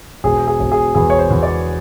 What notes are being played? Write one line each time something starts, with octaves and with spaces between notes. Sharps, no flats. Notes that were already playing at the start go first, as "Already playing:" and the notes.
E1 G#4
G#4
E1
G#4
E2 G#4
C#5
C5
E2
D5